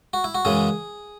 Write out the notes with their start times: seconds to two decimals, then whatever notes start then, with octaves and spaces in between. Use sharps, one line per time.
0.13 F#4
0.24 E4
0.35 F#4
0.45 F#2 C#3 E3 G#3 G#4